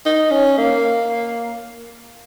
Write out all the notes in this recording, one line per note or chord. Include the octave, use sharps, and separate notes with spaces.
D#4
C#4
A#3